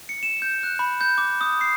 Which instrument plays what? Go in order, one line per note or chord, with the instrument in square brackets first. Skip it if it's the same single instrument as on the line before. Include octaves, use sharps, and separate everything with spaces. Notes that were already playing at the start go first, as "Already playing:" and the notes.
[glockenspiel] C#7
E7
G6
F#6
B5
G6
D6
D#6
C7